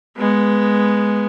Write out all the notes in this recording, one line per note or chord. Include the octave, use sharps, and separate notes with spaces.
G#3 B3